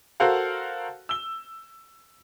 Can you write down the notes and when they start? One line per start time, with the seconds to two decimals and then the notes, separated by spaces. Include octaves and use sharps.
0.20 F#4 A4 A#4 C5 F5 F#5
1.09 E6 G7